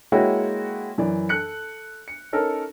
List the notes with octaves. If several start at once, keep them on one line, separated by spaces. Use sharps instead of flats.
G#3 A#3 E4 F#4 C#5 G5
F#2 E3 D5
A4 F#6 C#7
C#7
C#4 D#4 A4 A#4